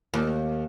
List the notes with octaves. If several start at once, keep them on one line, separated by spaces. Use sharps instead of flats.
D#2